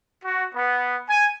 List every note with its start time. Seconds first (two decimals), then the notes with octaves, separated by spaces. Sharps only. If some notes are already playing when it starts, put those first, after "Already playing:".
0.23 F#4
0.55 B3
1.08 G#5